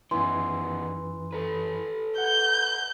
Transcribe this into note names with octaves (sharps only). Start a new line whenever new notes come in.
F#2 D#3 E3 B3 C6
A4 B4
F#5 G6